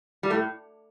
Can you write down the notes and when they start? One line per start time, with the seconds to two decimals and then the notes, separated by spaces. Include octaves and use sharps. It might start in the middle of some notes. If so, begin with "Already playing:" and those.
0.23 G3
0.30 A2 A3